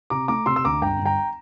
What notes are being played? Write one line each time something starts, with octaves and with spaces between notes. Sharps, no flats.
C3 A#5 D6
A3 A#5 D6
C3 C6 E6
E6
D2 A#5 D6
G1 G5 A#5
G1
G5 A#5